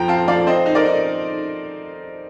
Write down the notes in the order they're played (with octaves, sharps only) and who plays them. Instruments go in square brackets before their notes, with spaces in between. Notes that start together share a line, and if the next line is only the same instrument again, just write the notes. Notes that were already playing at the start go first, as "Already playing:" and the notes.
Already playing: [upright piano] F2 F3 G5 A#5
C4 F5 A5
F3 D5 F5
C4 C5 D#5
D#4
A#4 D5
D#4